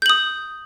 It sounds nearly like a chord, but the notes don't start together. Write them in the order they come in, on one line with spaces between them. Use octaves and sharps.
G6 F#7 D#6